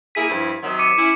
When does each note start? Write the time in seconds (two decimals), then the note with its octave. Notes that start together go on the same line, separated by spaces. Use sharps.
0.15 A#3 E4 G#4 B6 D#7
0.28 G2 F3 E4
0.61 C3 D#3 F#3
0.79 D6 C#7 D#7
0.96 C#4 E4